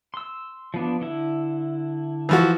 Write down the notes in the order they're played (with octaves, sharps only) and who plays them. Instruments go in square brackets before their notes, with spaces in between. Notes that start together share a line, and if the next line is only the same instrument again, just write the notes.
[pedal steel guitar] C6 E6
F3 B3 D4
D3 E4
[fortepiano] E3 F3 F#4